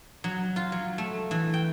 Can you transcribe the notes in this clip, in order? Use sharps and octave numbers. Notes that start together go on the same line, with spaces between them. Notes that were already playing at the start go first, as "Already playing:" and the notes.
F#3
F4
F#3
A3
E3
G5